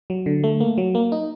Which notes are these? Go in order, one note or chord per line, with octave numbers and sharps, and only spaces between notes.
F#3
D3
A3
A#3
F#3
A#3
D#4